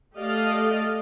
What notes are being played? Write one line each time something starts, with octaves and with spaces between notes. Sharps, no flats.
A3 G4 A4 D5 D#5 F5